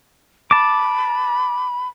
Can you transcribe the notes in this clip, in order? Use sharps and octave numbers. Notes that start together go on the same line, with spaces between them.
A5 B5 D6